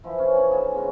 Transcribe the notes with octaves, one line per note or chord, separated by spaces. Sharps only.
E3 F3 E4
C#4
D4 C#5 B5
A#3 G#4 C5
C#3 B3 F#4